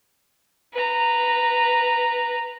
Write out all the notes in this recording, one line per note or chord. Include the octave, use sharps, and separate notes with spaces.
B4 A#5